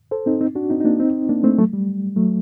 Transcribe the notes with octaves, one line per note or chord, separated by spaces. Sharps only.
A4 C5
C4 D#4
C4 D#4
D4 F#4
C4 D#4
D#4
A#3 D4
C4 D#4
A#3 D4
A3 C4
F#3 A3
G3
F#3 A3